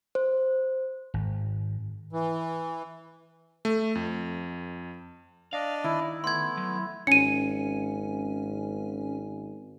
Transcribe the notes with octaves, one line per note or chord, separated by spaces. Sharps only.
C5
G#1
E3
A3
F2
D4 D5 D#5 F5
D#3 E4
A3 B3 C6 G#6
F#3
G#1 C#4 G#5 C#7 D#7